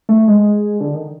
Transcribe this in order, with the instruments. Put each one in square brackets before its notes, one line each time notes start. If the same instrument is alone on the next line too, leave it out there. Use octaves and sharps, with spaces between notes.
[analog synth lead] A3
G#3
D3
D#3